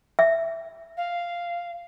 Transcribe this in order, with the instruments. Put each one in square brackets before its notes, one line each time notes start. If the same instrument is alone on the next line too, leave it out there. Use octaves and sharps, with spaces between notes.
[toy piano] E5
[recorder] F5